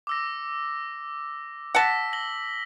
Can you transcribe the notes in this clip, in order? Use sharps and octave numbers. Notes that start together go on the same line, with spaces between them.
D6 E6 A#6
F#5 A5 E6 A#6 B6
A#6 F#7 G7